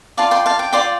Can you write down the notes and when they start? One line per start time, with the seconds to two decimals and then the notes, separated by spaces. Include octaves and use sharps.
0.17 F4 D5 F5 A5
0.31 G5 C6
0.46 F5 A5
0.59 G5
0.73 F4 D5 G5 C6